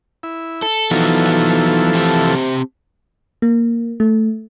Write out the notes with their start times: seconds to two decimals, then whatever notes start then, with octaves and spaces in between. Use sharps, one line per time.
0.23 E4
0.62 A4
0.91 E3 F3 B3 D#4 F#4 A4
1.94 C4 G4 A5
3.42 A#3
4.00 A3